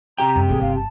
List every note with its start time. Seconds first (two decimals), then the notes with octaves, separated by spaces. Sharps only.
0.18 C3 G4 G5 A#5
0.36 F#2 G3
0.49 A1 A#3 G#4
0.61 G1 F5
0.75 A5